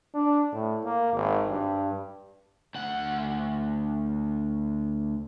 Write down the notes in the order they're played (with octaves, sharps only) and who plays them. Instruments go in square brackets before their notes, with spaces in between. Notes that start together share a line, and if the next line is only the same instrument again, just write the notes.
[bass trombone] D4
A2
A#3
G#1
G2
[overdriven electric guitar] D2 F#5